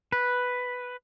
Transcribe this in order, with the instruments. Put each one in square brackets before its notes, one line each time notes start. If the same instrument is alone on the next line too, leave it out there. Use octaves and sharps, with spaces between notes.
[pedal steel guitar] B4